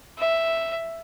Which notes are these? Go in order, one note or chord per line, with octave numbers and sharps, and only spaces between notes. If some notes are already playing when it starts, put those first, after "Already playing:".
E5